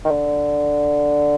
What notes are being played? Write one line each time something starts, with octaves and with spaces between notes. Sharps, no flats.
D#3
D3